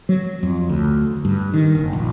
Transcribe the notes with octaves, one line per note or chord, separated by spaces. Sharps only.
F#3
F2
D2
G2
D#3
F#1
A#1